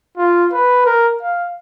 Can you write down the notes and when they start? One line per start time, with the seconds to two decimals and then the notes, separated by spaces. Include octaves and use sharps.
0.17 F4
0.52 B4
0.85 A#4
1.22 F5